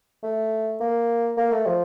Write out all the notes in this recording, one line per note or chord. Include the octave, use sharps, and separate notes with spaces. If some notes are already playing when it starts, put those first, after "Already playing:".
A3
A#3
A#3
A3
F3